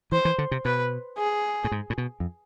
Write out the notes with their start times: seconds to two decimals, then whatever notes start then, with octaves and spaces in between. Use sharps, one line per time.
0.12 E3 C5
0.25 E3
0.38 D3
0.51 C3
0.65 B2 B4
1.18 G#4
1.64 A2
1.72 G#2
1.90 A2
1.98 B2
2.20 F2